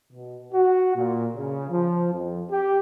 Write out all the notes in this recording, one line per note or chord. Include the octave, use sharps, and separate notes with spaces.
B2
F#4
A#2
C#3
F3
F2
G4